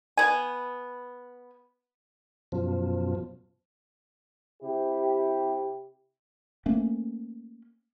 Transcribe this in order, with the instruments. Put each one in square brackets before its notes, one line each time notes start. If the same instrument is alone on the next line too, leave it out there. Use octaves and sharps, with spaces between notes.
[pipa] B3 G#5
[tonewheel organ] F#2 B2 F3
[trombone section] C3 E4 G4
[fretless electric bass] A3 A#3 C4 C#4